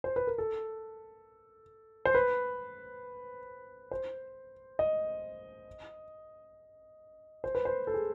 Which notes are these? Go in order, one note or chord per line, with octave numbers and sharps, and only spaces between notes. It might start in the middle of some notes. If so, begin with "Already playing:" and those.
C5
B4
A#4
A4
C5
B4
C5
D#5
C5
B4
C5
A4
G#4